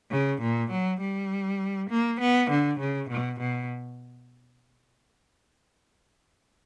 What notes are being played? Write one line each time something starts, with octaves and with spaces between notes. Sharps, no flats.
C#3
A#2
F#3
G3
A#3
B3
D3
C#3
B2
B2